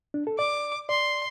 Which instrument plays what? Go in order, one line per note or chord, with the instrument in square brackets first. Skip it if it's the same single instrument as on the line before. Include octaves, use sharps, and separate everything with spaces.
[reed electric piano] D4
A4
[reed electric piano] D5 [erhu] D6
[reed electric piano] D5 [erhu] C6